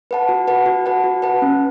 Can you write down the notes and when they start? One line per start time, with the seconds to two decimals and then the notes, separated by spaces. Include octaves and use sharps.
0.11 B4 F#5 A5
0.29 F#4
0.48 B4 F#5 A5
0.66 F#4
0.86 B4 F#5 A5
1.04 F#4
1.22 B4 F#5 A5
1.42 C#4